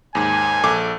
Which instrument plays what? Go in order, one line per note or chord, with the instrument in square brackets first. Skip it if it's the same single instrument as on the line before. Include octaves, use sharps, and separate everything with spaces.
[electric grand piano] D#2 G#2 [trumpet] G#5
[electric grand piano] A#1 A4 D6